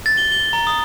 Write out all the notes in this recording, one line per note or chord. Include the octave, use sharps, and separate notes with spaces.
A6
G7
G7
A#5
D#6